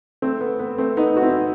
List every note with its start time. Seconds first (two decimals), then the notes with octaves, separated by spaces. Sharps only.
0.22 A3 C4
0.40 B3
0.59 B3
0.78 A3 C4
0.97 B3 D#4
1.17 F#4
1.22 C4 E4